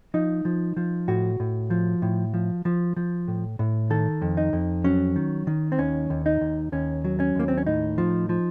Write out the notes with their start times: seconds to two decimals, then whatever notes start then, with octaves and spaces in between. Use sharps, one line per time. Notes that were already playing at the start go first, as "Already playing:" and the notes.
0.14 F3 D#4
0.45 F3
0.77 F3
1.08 A2 F#4
1.40 A2
1.70 F3
2.02 A2
2.34 F3
2.65 F3
2.96 F3
3.28 A2
3.59 A2
3.90 D#3 A4
4.22 F2
4.37 D#4
4.53 F2
4.84 F#3 C#4
5.16 D#3
5.47 D#3
5.72 C4
5.78 D#2 C#4
6.10 D#2
6.26 D#4
6.41 D#2
6.72 D#2 C#4
7.04 F#3
7.20 C#4
7.36 D#2 A#3
7.48 C4
7.58 C#4
7.66 A2 D#4
7.98 F3
8.29 F3